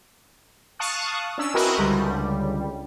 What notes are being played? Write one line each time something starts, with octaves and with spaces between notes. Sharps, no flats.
F5 A5 C#6 D#6 F#6
C#4 D4 E6
C4 E4 F#4 A#4 B4 D#5
C#2 D3 G3